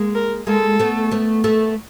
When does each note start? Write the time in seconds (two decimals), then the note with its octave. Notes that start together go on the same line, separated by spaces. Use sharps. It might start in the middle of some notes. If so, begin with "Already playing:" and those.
Already playing: G#3 A#3
0.15 A#4
0.47 G#3 A#3 A4
0.80 A3 B3
1.11 A3 B3
1.44 A3 B3